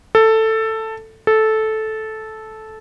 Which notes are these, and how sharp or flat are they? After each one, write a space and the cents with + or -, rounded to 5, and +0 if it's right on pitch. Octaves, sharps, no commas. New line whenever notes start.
A4 +10
A4 -10